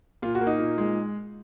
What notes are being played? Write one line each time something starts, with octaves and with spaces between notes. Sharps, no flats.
A#2 F4
F#4
A#3
D#4
A#2
G#3